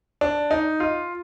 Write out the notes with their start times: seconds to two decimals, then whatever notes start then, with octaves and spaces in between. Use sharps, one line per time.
0.21 D4
0.51 D#4
0.80 F4